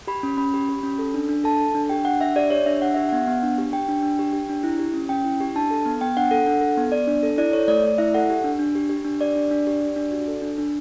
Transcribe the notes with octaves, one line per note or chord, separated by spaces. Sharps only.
G4 B5
C#4
C#4 B5
G4
G4
C#4
A4
D4
D4
A4 A5
A4
D4
G4 G5
D4 F#5
D4 E5
G4 D5
G4 C#5
D4 E5
D4 F#5
G4 E5
B3 F#5
B3
D4
G4
G4 G5
D4
D4
G4
G4
D4
E4
G4
C#4
C#4 G5
E4
G4
D4 A5
A4
B3
B3 G5
D4 F#5
A4 F#5
D4 F#5
A4
B3
B3 D5
D4
A4
E4 D5
A4 C#5
A3 D5
A3 D5
E4 E5
A4 F#5
G4
D4
D4
G4
G4
D4
G4 D5
D4
D4
G4
G4
D4
F#4
A4
D4
D4